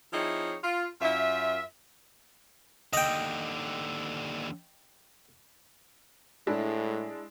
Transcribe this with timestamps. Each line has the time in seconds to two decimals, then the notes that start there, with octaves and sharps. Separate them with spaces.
0.13 F3 C4 D#4 E4 G#4 C#5
0.64 F4
1.01 F#2 F4 E5
2.93 D#2 D3 D#5 G5
6.47 A2 G#3 D4 E4